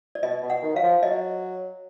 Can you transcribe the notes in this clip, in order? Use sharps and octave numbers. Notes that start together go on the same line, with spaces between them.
D5
B2 D#5
B2
F#5
D#3
F#3 F5
F3
F#3 D#5